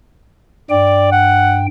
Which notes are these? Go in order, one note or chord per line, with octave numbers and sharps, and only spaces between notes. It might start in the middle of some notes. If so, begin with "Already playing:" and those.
G2 D5 G5
F#5